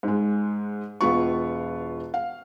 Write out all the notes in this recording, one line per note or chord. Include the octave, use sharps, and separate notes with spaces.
G#2 G#3
E1 B3 F4 C#6
F5